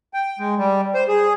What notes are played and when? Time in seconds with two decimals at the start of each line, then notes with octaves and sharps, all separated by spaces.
0.14 G5
0.39 G#3
0.58 G3
0.95 C5
1.08 G#4